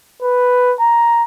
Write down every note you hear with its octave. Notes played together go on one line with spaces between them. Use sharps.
B4
A#5